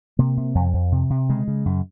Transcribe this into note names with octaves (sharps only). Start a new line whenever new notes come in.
C3 A#3
C3
F2
F2
C3
C3
C#3 G#3
C#3
F#2